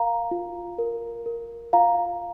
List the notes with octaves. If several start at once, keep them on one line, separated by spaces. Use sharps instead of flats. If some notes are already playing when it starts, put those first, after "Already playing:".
Already playing: A#4 F5 A#5
F4
A#4
A#4
F4 F5 A#5